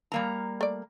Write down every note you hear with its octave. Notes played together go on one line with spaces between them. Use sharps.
G3 A#3 A#5
A3 D5